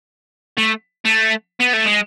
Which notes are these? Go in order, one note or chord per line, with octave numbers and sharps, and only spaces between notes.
A3
A3
B3
A3
G#3